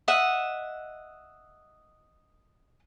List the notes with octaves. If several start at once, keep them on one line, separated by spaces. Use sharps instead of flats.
D#5 E5 F#5